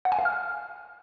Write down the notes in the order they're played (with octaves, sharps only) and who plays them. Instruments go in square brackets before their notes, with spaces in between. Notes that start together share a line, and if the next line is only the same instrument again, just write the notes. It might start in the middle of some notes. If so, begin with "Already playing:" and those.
[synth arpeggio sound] F#5
G#5
F5
F6